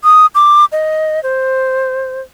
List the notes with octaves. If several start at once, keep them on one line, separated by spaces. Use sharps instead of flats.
D#6
D6
D#5
C5